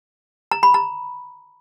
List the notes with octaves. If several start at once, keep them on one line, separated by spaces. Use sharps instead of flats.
A#5
B5
A#5